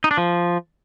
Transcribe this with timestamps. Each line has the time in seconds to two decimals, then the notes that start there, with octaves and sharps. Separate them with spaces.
0.04 D#4
0.11 D4
0.18 F3